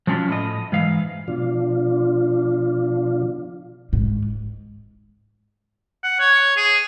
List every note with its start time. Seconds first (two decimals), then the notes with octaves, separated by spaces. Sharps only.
0.07 F3 F#3 C#4 D4 F4
0.28 A2 D#5
0.72 G#2 E3 F5
1.28 B2 F3 D4 F4
3.93 G#2
6.03 F#5
6.20 C#5
6.57 G#4